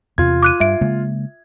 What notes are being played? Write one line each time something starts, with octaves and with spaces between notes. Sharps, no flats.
E2 C3 F4 G#6
D6 F#6 D#7
G2 E5 D7
C#3 G#3 A#3